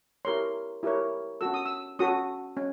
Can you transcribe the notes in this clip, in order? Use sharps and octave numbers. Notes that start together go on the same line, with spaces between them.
E4 G4 A#4 C#5 C6
E4 G4 A#4 C#5
C#4 F#4 A4 E6
D#6
E6
C#4 F#4 A4 D#6
C#4